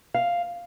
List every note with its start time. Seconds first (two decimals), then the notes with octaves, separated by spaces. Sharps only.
0.14 F5